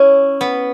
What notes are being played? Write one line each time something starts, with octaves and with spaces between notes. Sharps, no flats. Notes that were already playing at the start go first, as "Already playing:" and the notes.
Already playing: C#4 E4
B3